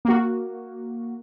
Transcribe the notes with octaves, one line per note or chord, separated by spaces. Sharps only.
A#3 F#4